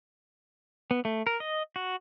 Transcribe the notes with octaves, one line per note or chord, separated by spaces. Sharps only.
B3
A3
A#4
D#5
F#4